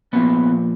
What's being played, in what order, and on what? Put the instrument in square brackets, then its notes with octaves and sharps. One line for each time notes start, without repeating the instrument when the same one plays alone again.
[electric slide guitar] A#2 F3 B3